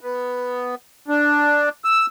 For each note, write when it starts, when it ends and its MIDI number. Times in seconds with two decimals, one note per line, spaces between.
0.01 0.75 59
1.08 1.69 62
1.84 2.06 88